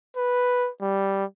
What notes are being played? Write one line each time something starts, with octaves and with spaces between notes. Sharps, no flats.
B4
G3